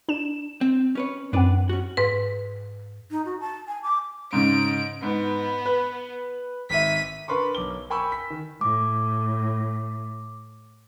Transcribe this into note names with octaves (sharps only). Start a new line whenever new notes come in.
D4 E7
C4
C#4 B4 C#5
F#2 C4 D4 B4 D5 F#5
C#4 F#4
G#2 B4
D#4
F#4
A5
G#5
D6
G#2 C#3 D7
G#2 B3
B4
G#1 E5 B6 D#7
D4 A#4 B4 C6 C#6
B1 D6 G7
A#4 G5 G#5 B5 C#6 E6
B6
D#3
A2 D6